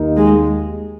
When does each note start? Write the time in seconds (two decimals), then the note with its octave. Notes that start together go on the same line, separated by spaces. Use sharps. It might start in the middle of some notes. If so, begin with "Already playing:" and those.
Already playing: D#2 D#3 A#3 D#4 A#4
0.16 G#3